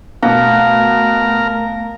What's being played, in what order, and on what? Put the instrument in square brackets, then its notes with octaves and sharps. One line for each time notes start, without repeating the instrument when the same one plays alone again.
[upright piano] B2 [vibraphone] A3 [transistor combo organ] A#4 [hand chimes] F5